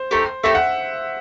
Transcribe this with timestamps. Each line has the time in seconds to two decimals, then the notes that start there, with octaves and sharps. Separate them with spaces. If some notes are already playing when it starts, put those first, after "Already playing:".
Already playing: C5
0.11 A3 D#4 G4
0.44 A3 D#4 G4 E5
0.55 F#5